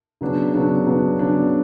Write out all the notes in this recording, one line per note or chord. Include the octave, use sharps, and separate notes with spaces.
C#3 F#3 B3 D4
C#3 F#3 B3 D4
C#3 F#3 B3 D4
C#3 F#3 B3 D4